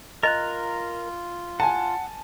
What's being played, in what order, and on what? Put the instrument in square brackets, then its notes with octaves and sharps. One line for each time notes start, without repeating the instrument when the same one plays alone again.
[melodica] F4 [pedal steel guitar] A#4 A#5 F#6 [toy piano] D#5
[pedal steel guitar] F#5 [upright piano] G#5 A5